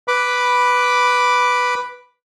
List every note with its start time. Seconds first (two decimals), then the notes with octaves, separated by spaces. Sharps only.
0.08 B4 B5 D6